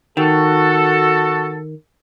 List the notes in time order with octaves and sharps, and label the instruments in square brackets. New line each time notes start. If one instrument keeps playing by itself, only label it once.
[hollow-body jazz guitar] D#3 [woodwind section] F#4 A4